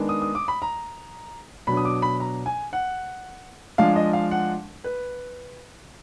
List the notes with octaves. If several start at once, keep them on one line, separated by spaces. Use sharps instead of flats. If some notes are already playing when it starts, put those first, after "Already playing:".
Already playing: D#3 G#3 B3 D4
D#6
D#6
D6
B5
A#5
B2 F#3 D4 B5
D#6
D6
B5
A#5
G#5
F#5
F3 G#3 D4 F5
D#5
F5
F#5
B4